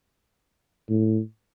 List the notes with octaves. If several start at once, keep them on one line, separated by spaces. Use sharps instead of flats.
A2